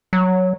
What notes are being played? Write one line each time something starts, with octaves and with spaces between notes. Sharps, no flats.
F#3